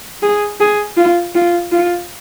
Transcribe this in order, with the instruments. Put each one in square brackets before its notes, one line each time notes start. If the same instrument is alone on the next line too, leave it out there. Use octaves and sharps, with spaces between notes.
[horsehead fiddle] G#4
G#4
F4
F4
F4